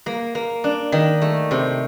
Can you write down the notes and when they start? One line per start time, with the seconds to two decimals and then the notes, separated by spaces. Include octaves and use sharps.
0.06 A#3
0.35 A#3
0.64 D4
0.92 D#3
1.21 A3
1.51 C3